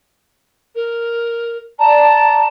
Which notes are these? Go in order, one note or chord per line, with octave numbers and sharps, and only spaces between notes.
A#4
D5 A5 A#5